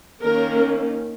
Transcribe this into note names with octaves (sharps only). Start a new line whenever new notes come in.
D#3 A#3 C#4 A#4